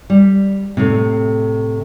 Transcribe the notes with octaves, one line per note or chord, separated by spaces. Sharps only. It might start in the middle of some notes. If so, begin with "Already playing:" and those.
G3
A2 C3